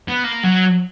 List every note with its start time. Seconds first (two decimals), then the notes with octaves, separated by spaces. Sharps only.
0.08 B3
0.24 A#3
0.44 F#3